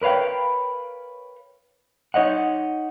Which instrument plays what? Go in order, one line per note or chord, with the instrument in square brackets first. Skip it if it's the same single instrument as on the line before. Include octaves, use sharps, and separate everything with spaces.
[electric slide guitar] A#4 B4 C#5 F5 G5
D#4 C#5 D#5 F#5